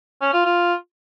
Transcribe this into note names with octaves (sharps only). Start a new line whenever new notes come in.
C#4
F4
F4